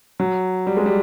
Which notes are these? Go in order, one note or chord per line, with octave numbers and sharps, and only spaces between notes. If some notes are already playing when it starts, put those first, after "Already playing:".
F#3
G3
G#3
G3